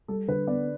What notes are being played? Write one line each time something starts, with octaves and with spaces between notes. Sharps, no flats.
G3 A4
D3 B4
B3 D5